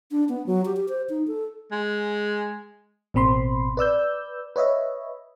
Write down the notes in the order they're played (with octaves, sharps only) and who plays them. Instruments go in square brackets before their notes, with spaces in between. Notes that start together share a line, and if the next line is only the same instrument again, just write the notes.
[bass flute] D4
B3
F#3
G4
G4
C5
D#4
A4
[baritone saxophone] G#3
[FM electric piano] A1 B2 C4 B5 C6
B4 D5 E6 G6
B4 C#5 D#5 E5